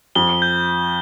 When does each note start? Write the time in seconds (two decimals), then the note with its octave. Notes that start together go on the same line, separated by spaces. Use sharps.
0.15 F2 G7
0.42 G6